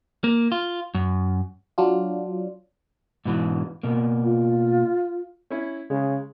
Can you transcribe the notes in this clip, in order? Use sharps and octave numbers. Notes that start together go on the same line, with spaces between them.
A#3
F4
F#2
F#3 D4 F4
G#2 B2 E3
B2 A#3
F4
C#4 E4
C#3 G#3